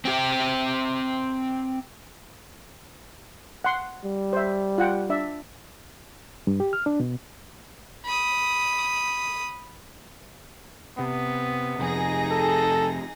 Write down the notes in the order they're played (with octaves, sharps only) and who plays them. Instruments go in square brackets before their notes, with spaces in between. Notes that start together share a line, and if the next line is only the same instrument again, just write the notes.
[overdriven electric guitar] C4 G4
[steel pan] F#5 C6
[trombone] G3
[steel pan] C5 E5
F4 F#5 G5
D4 D5 E5
[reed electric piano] G2
G4
F6
D4
B2
[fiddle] B5 D#6
[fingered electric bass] C3 [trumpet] B3
[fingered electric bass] F2 C3 [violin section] D#4 G#4 A#6
[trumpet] A4